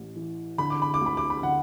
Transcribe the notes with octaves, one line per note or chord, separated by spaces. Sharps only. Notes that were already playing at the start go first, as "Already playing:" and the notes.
Already playing: A1
E3
D3 B5
D6
B5
D6
D2
B5
D6
B5
D3 F#5